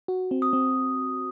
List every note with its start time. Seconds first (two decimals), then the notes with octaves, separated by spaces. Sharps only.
0.08 F#4
0.31 C4
0.42 D#6
0.53 C4